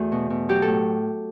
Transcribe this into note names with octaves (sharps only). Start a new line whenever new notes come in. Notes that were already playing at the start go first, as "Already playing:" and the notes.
Already playing: E2 A3 F#4
B2
B2
F#3 G4
A4
A2